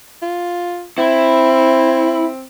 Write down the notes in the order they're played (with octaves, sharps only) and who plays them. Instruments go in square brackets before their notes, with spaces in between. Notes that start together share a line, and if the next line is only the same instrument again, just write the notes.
[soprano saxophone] F4
[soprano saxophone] C4 [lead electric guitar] E4